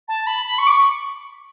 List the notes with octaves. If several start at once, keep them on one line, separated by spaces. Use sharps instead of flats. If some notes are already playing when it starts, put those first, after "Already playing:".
A5
B5
B5
C#6
D6
C#6